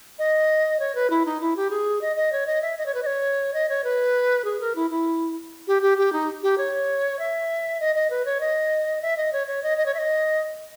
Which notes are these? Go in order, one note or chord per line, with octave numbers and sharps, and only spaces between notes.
D#5
C#5
B4
E4
D#4
E4
G4
G#4
D#5
D#5
C#5
D#5
E5
D#5
C#5
B4
D#5
C#5
D#5
C#5
B4
G#4
A#4
E4
E4
G4
G4
G4
D#4
G4
C#5
E5
D#5
D#5
B4
C#5
D#5
E5
D#5
C#5
C#5
D#5
D#5
C#5
E5
D#5